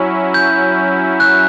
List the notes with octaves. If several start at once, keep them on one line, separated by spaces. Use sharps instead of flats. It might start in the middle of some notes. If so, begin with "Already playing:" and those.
Already playing: F#3 C#4 E4
G6
F#6